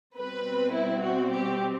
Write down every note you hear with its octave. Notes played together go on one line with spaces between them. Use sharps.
B2 G3 C4 B4
E4
F#4
G4